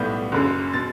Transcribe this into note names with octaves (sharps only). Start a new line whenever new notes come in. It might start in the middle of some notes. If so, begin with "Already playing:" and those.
Already playing: B1 A2 G3 B3 G6
F#1 F#2 C#3
B2 A6